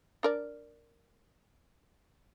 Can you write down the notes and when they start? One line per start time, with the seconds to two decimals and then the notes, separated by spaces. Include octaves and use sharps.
0.23 D4 A#4 D5